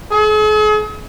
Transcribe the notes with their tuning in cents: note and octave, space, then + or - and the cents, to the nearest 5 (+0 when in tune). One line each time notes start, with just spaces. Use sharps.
G#4 +45